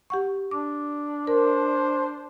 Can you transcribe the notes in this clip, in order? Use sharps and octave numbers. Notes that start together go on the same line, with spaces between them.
G4 F#5 C#6
D4 D6
A#4 C5